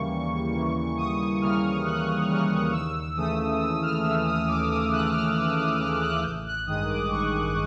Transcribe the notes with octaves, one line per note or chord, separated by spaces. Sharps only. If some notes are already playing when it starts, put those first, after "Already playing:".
Already playing: D#2 C#3 E3 G3 A#3 C#6
D#2
C#3 E3 G3 A#3
D#2 D#6
C#3 E3 G3 A#3 F6
D#2 F#6
C#3 E3 G3 A#3 F6
D#2 E6
C#3 E3 A3 D#6
D#2 E6
F6
C#3 E3 A3 E6
D#6
D#2 D6
D#6
C#3 E3 A3 F#6
F6
D#2 E6
D#6
C#3 E3 A3 F6
F#6
A1 G6
F#6
G2 D#3 G#3 D#6
D6
A1 C#6